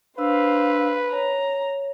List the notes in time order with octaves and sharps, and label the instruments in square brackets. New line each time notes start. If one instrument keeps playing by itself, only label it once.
[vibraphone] D4 E6 [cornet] B4 [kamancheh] C5 F5
[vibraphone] C#5 [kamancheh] A#5